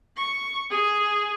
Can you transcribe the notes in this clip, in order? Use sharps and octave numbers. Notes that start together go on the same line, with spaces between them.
C#6
G#4